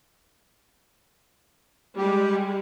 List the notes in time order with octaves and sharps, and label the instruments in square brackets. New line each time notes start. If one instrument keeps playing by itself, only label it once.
[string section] G3 G#3 [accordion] G4